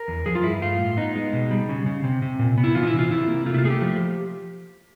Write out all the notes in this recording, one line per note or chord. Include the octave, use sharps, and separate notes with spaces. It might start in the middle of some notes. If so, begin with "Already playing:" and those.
Already playing: A#4
E2
F3 G#4
F4
G2 E4
A3 F4
A2
B3 D#4
G#3
B2
G3
C#3
C#3
C3
C3
A#2
B3
E4
E3 F4
D#4
E4
C3
F4
C3 E4
A#3
A3 F4
E4
F4
A3 G#4
G4
F3